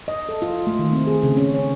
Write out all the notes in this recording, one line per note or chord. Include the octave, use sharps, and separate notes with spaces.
D#5
A4
F4
A3
D#3
C4
G#4
C#3
C#4
C#5